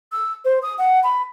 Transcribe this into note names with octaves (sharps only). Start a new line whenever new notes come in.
E6
C5
D#6
F#5
B5